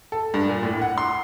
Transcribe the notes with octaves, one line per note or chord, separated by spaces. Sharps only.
A4
G2
A#2
A2
F#5
C6